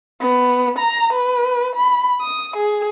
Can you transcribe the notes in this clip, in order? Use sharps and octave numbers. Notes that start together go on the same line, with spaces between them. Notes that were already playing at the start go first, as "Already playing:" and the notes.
B3
A#5
B4
B5
D#6
G#4